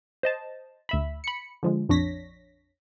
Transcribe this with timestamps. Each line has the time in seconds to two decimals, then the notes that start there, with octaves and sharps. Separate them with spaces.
0.23 C5 D#5 A5
0.89 D2 E5 B5
1.24 B5 C#7
1.63 D3 F3 G#3
1.89 A#1 F2 D4 C#5 A#6 B6